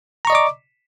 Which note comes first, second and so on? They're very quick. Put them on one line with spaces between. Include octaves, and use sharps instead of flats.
A#5 C#6 D#5 D5 D6